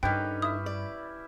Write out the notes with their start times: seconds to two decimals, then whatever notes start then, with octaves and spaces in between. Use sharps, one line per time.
0.03 G2 D3 C#4 D#4 G4 B4 G5
0.42 E4 E5 D#6
0.66 D5